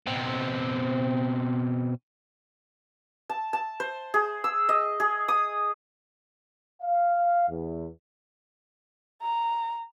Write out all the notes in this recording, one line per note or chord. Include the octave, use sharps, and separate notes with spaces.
B2 C4
A5
A5
C5
G#4
E6
D#5
G#4
D#6
F5
E2
A#5